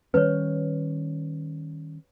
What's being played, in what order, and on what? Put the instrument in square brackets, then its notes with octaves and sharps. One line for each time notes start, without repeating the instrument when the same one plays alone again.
[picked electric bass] D#3 G3 C#4 [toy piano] B4 C#5